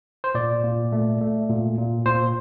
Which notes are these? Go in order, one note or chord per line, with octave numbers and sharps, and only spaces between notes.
C5
A#2 D5
A#2
A3
A3
A#2
A#2
A#2 C5